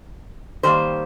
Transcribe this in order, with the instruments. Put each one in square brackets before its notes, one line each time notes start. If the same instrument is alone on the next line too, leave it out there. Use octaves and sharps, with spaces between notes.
[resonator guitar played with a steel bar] D#3 G3 A#3 C5